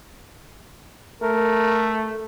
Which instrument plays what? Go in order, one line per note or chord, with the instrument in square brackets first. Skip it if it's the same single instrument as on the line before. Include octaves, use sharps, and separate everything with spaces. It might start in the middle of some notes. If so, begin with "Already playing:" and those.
[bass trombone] A3 [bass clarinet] A#4